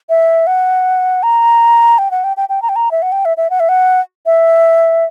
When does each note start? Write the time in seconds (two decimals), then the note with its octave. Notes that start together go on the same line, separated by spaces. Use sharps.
0.09 E5
0.47 F#5
1.23 A#5
1.98 G5
2.11 F#5
2.24 G5
2.37 G5
2.49 G5
2.62 A#5
2.69 G5
2.76 A#5
2.91 E5
3.02 F#5
3.12 G5
3.25 E5
3.37 E5
3.50 F#5
3.60 E5
3.69 F#5
4.26 E5